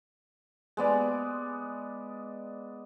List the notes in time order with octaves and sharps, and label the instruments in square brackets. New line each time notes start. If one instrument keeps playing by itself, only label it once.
[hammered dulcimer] G#3 B3 D5